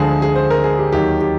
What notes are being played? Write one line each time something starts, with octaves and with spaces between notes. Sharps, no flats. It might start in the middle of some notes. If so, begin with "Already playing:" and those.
Already playing: D2 D3 F3 G#3 G#4
G#4
C5
A#4
G#4
G4
D#2 D#3 F#3 G4
G4